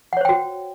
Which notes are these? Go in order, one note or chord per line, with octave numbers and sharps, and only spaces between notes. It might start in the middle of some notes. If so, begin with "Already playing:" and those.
F#4 C5 C#5 F#5 G5